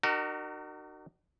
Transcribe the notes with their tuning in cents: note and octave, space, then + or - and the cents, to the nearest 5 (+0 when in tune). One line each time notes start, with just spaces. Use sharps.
D#4 -40 F#4 +25 A#4 -15